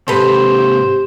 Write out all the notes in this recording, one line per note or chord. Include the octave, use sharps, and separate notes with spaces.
G#2 C3 G4 A4 B4 C5